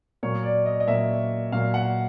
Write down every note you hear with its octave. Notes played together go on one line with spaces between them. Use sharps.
A#2 F#3 A#3 C#5
D5
D#5
D#5
A#2 F#3 A#3 E5
A#2 F#3 A#3 F5
F#5